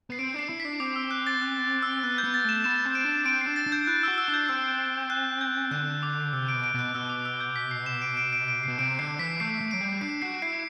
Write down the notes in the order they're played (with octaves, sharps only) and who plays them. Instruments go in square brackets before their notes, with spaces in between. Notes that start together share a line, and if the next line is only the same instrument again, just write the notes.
[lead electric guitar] B3 [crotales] C7
[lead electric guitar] C4 [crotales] D7
[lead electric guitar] D4 [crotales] C7
[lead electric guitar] E4
[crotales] B6
[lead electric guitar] D4
[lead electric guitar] C4 [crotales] D6
[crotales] E6
F#6
A6
F#6
E6
[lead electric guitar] B3 [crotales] F#6
[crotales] G6
[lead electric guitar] B3
[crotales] A6
[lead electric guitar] A3 [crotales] E7
[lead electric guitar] B3 [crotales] E7
[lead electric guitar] C4
[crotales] D7
[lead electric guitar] D4
[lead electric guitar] C4 [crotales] D7
[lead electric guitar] D4 [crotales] C7
[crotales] A6
[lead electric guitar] D4
[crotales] G6
[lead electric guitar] E4 [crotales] F#6
[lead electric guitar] F#4 [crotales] E6
[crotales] E6
[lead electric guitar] D4
[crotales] G6
[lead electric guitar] C4 [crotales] E6
[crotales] F#6
G6
[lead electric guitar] D3 [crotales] F#6
[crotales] D6
[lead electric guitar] C3 [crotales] E6
[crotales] D7
[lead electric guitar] B2
[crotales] D7
[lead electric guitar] B2 [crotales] F#6
[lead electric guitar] B2 [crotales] E6
[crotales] D6
E6
G6
B6
C7
E7
D7
D7
D7
D7
[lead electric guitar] B2 [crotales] C7
[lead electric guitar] C3 [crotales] D7
[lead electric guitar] D3 [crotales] C7
[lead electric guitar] E3 [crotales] B6
[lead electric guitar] A3 [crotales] C7
[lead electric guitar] A3
[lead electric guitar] F#3 [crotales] D7
[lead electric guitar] G3
[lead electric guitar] D4 [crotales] C7
[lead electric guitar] F#4 [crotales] C7
[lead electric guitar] E4 [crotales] C7